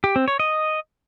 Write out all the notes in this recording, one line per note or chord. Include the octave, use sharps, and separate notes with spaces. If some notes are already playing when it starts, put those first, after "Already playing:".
G4
C4
C#5
D#5